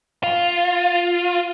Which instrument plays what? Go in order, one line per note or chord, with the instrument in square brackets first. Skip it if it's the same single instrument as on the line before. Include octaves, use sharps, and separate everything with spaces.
[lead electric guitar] F4